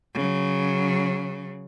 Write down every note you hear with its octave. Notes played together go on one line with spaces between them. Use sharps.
C#3 F#3